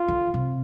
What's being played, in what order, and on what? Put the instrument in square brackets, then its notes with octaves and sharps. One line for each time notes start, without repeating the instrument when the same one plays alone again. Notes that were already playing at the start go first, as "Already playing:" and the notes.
Already playing: [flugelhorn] F4
[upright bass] D3
C3